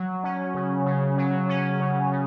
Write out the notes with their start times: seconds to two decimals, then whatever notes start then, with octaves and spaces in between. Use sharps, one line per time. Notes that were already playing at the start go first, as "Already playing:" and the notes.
Already playing: F#3
0.24 C#4
0.54 C#3
0.86 C#3
1.17 F#3
1.49 C#4
1.80 C#3
2.11 C#3